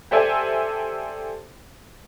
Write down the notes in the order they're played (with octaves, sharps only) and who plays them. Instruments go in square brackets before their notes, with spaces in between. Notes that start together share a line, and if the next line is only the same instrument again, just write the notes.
[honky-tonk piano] G4 A4 C5 D5 E5 G#5